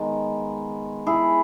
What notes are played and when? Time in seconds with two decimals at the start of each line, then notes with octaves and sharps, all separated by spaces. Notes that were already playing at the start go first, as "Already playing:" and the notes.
Already playing: D#3 G#3 B3
1.07 E4 G#4